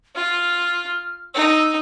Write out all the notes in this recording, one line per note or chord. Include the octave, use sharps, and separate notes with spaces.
F4 F6
D#4 E6